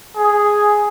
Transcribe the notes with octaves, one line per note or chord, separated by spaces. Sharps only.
G#4